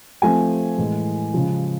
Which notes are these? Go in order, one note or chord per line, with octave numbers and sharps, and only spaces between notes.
F3 A3 C4 G#5
A2 E3 G#3
C#3 F3 G#3